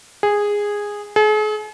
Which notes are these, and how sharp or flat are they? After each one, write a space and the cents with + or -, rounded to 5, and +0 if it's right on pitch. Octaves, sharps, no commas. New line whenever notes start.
G#4 -10
G#4 +45